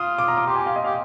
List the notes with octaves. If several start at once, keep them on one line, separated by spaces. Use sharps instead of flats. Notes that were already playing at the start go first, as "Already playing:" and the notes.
Already playing: F4 D#6
D6
A#5
D6
G4 C6
G#5
F5
D#5
G4 F5